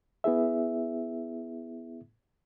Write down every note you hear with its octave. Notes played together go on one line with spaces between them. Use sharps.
B3 E4 G#4 E5